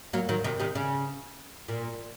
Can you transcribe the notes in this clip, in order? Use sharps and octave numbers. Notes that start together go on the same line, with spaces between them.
F#3 A#3
D#3 F#3
C3 D#3
C3 D#3
C#3
A#2